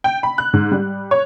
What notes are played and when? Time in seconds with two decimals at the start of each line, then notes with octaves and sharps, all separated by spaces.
0.04 G5
0.23 B5
0.38 F#6
0.53 G#2
0.72 G3
1.11 C#5